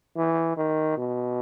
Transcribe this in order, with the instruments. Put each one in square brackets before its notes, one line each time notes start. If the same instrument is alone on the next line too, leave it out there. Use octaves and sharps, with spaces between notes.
[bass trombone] E3
D#3
B2